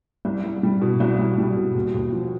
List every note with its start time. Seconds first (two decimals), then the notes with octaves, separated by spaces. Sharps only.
0.25 C2
0.44 C2
0.63 G3
0.82 B2
1.00 C2
1.19 C2
1.38 G3
1.57 B2
1.75 D#2
1.94 D#2
2.12 F3